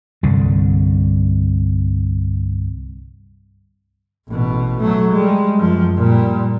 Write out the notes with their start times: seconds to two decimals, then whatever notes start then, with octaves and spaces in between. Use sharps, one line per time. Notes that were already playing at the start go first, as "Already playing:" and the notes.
0.23 C2 G2 D3
4.28 A1 B2
4.80 F#3 A3
5.12 G3 G#3
5.59 F#2 F3
5.97 A#2 G3